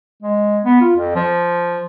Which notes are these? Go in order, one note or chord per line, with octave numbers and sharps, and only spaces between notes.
G#3
B3
F4
F2
F3